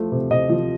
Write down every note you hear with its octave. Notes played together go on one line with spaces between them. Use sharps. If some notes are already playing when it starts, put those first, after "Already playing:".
Already playing: F3 A3
C3
C3 D#5
F3